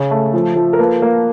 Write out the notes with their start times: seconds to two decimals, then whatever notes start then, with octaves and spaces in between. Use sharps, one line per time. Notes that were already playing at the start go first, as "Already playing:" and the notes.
Already playing: C#3
0.11 A3
0.34 F3
0.56 F3
0.73 A#4
0.79 A#3 A4 B4
1.02 A#3